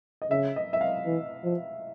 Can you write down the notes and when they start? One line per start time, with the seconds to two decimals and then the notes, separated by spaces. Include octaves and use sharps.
0.22 D#5
0.30 C#3 E5
0.56 D#5
0.73 E5
0.81 F5
1.06 E3
1.44 F3